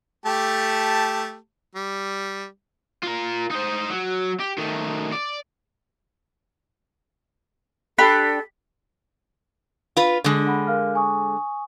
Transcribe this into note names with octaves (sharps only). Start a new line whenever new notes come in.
A3 G4 A5
G3
F4 A#4
D#4 C5
F#3
G4
D#3 A3
D5
D4 G4 A4 B5
F4 B4
D3 G#3
F#5 B5
A#4 F5 F6
G#5 C#6 D#6